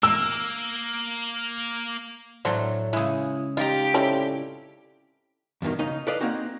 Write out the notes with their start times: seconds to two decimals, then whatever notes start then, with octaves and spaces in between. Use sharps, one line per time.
0.03 A#3 E6
2.45 A2 D3 F#3 A3 D4 C5
2.93 C#3 E3 G#3 E4 D#6
3.57 D#4 F4 G4 D#5 A#5
3.94 C4 C#4 D#4 E4 A4 D5
5.62 E2 G2 B2 D#3
5.79 C#3 D#4 D#5 A#5
6.07 A4 B4 D5 D#5 F5
6.21 A#3 C4 D#4 F#4